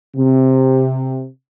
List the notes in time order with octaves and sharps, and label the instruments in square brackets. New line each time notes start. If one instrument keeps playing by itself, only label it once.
[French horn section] C3